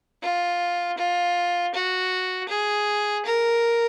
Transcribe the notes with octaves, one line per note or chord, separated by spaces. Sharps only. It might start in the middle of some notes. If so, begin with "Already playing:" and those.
F4
F4
F#4
G#4
A#4